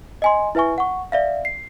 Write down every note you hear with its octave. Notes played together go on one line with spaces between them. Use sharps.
D#5 G#5 C6
E4 B4 E5 G#5 C#6
F#5 C#6
D5 E5 F5
C7